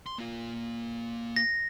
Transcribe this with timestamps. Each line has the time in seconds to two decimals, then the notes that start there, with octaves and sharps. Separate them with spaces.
0.06 C6
0.18 A#3 F4
1.36 A#6